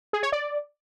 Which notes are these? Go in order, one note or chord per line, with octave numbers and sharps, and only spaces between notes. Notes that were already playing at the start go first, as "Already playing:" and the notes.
G#4
C#5
D5